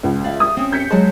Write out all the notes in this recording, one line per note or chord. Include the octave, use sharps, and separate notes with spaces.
C#2
D5 E5 F5
D#6
C4 C#4
G6 B6 C#7
F#3 G#3 A5